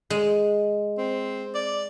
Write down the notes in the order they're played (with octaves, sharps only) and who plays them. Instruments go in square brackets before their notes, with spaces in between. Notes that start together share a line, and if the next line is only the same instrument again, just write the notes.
[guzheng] G#3
[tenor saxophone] C4
D5